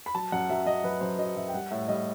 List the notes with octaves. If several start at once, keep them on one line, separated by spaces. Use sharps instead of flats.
B5
F#3 A5
F#2 F#5
F#3 E5
F#2 D#5
F#3 B4
F#2 C5
F#3 D#5
F#2 E5
G5
G3 F#5
A2 E5
G3 D#5